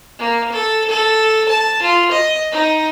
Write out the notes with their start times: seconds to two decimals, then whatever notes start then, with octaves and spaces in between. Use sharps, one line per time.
0.19 A#3
0.52 A4
0.89 A4
1.49 A5
1.82 F4
2.11 D#5
2.52 D#4